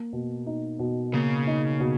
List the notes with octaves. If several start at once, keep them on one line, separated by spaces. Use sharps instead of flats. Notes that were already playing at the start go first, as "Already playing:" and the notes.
Already playing: A#3
B2
D#4
B2
C#3 A#3
D#4
B2